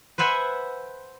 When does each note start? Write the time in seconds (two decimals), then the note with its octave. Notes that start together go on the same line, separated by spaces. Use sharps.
0.18 B4 C5 E5 F#5 G#5 B5